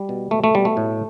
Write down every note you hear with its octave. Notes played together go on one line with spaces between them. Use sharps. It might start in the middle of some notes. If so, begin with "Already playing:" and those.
Already playing: G3
B2
B2 A3
A3
B2 G3
A3
A2